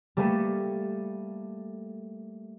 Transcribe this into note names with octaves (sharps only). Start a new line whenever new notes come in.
G3 A3 A#3 A4 D#7